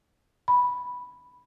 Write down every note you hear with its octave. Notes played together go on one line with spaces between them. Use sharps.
B5